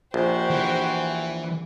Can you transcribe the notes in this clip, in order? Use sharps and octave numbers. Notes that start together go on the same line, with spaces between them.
A#1 F#4 G4 C5
E3